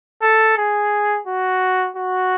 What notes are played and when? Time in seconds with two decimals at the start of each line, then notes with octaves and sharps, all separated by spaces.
0.22 A4
0.57 G#4
1.27 F#4
1.96 F#4